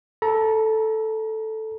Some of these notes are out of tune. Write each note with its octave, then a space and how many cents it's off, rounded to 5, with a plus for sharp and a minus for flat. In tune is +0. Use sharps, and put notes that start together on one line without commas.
A4 +0 A#5 +35